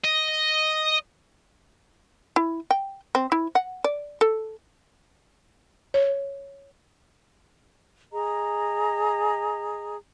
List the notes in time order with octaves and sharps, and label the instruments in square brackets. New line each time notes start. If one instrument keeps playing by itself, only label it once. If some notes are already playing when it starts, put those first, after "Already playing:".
[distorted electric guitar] D#5
[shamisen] E4
G5
C4
E4
F#5
D5
A4
[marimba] C#5
[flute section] G#4 D#5 A#5